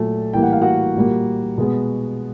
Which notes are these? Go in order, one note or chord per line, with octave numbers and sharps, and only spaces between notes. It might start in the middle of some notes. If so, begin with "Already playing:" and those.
Already playing: A#2 F#3 A3
A2 E3 G3 A#3 G5
F#5
F5
F#4 F#5
A#2 G3 A#3
B2 G#3 B3